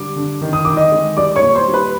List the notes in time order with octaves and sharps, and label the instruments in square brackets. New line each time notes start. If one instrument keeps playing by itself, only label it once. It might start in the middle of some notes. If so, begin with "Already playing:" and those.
Already playing: [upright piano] D3 G3 [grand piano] D6
[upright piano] D3
D#3
[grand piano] D#6
[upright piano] D#3 [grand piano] D6
[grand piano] D#5 D#6
[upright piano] G#3
[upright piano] G3 [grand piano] D5 D6
[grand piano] C#5 C#6
[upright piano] A#2
[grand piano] C5 C6
[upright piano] G3
[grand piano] B4 B5